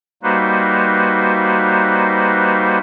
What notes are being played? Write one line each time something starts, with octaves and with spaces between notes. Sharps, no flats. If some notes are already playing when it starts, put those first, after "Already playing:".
G3 A#3 D#4 F#4 B4 C5